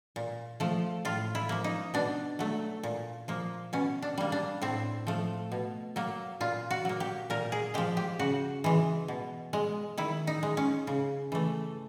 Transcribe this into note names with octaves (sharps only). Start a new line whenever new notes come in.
A#2
F3 A3
A2 F4
E4
F3 A#3
D#4
B2 D4
F#3 A3
A#2
F3 A#3
B2 C#4
D4
G3 A#3
D4
A2 C4
F3 A3
B2
F#3 A#3
A#2 F4
F#4
F#3 A#3
G4
A#2 A#4
G#4
F3 G#3 G4
G4
C#3 F#4
E3 G#3
B2
G#3
D#3 E4
D#4
G#3
C#4
C#3
E3 A3